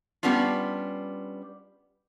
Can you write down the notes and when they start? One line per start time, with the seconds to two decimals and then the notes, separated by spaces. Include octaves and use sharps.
0.23 G3 B3 C#4 D4 F4